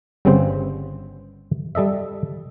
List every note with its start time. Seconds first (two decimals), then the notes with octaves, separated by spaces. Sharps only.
0.25 G1 G2 C#3 B3 C4 C5
1.75 G3 A4 D#5 E5